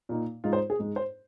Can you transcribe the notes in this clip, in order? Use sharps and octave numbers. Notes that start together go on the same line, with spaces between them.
A#2 A#3 D#4
G#2 G#3 D#4 F4
C5
G#4
G#2 G#3 D#4
C5